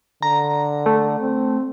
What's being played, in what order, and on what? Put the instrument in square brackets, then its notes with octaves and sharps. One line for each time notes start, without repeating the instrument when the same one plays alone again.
[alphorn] D3 [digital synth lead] A#5
[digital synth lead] A3
[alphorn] C4